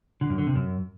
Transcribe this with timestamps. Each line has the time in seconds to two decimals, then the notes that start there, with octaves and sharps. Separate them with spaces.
0.21 D3
0.30 F#2
0.38 D3
0.47 C3
0.55 F#2